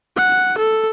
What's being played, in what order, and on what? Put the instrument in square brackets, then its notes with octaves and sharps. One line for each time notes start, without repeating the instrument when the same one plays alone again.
[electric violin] F#5
A4